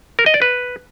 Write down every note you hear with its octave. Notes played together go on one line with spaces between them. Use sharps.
A#4
D#5
D5
B4